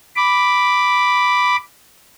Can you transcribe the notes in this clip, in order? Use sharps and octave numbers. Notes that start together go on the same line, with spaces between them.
B5 D6